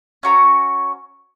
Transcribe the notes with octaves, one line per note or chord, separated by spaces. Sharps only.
C#4 F#4 A#5